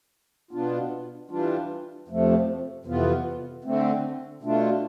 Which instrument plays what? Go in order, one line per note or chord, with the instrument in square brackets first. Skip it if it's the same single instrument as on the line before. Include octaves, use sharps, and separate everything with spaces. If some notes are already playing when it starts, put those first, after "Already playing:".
[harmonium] B2 B3 D4 F4
E3 G3 D4 F4
F2 C3 F3 A3
F2 C3 E3 B3 F4
D3 A3 C4
B2 A3 D4 F4